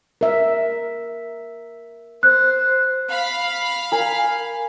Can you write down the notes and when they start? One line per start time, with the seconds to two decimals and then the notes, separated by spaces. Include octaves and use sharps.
0.21 A#4 E5
2.23 C5 F#6
3.10 F5 B5
3.92 A#4 G#5